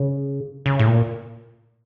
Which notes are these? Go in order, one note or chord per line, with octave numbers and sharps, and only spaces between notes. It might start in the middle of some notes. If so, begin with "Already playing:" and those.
Already playing: C#3
C#3
A2
A#2